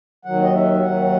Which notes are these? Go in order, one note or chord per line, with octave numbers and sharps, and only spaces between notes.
D#2 D#3 F#3 F#5
D#5
E5
D#2 D#3 F#3 F#5